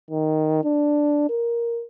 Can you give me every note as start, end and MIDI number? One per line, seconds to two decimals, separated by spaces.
0.11 0.63 51
0.64 1.28 62
1.30 1.84 70